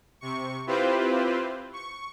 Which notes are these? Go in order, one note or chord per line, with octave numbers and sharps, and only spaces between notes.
C3 C#6
C4 E4 F4 G4 B4 C5
C#6